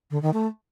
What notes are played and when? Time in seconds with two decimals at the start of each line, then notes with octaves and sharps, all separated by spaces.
0.11 D3
0.22 D#3
0.33 A3